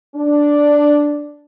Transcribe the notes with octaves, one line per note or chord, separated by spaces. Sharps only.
D4